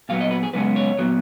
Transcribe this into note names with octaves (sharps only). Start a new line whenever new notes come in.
A#2 F#3 B3 F5
D#5
B4
G#4
F#2 C#3 G#3 B3 B4
C#5
A#2 F#3 B3